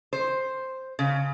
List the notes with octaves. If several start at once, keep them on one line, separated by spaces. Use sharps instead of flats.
C5
C#3